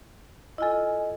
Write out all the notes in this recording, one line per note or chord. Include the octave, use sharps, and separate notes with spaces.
E4 F4 A4 D#5 G#5